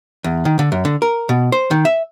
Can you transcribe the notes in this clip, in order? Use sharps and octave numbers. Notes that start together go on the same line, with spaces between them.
E2
D#3
D3
F#2
D3
A#4
B2
C5
D#3
E5